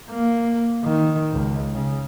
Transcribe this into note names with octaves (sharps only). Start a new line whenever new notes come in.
A#3
D#3
C#2
C#3